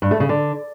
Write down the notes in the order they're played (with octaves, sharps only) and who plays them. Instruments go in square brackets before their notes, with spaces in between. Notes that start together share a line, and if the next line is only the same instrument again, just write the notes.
[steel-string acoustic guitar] G2
A3
C#3
D3